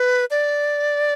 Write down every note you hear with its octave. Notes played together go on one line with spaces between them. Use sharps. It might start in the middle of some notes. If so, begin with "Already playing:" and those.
Already playing: B4
D5